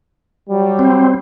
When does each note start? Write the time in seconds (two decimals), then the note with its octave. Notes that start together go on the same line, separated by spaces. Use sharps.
0.49 F#3 G3
0.79 C4